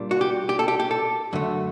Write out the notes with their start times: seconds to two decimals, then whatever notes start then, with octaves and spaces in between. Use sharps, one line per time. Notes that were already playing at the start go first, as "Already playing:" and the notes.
Already playing: A#2 G3 D4
0.11 F#4
0.21 G4
0.49 G4
0.59 A4
0.68 G4
0.80 G4
0.91 A4
1.33 F#2 D3 A3